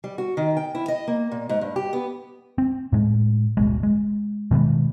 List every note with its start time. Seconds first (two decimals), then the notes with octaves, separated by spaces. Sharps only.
0.04 G3
0.18 F#4
0.37 D#3
0.57 G5
0.75 E4
0.88 D#5
1.08 A#3
1.32 A#2
1.49 G#2
1.61 G2
1.76 G4
1.93 B3
2.58 C4
2.93 A2 G#3
3.57 D1 G1 B2 G#3
3.83 G#3
4.51 B2 D#3 G#3 B3